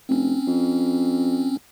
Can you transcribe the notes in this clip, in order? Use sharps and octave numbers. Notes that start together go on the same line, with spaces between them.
F1 C4 C#4
F2